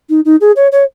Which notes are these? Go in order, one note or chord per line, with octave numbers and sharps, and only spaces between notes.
D#4
D#4
G#4
C#5
C#5